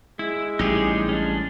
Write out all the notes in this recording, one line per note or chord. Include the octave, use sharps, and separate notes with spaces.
G#3 E4
A1 G3 D#4 G4 G#4
C#4 D4